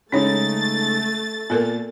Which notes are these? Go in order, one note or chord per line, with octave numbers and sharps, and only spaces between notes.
C#3 G#3 A3 C#4 D#4 C#5 A6
A#2 B3 A4 A#4